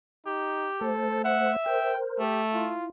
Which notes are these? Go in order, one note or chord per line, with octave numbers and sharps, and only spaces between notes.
D#4 G4
A3 A4 C5
E5 F#5
A#4 C5 G5
A3 G4
E4 F4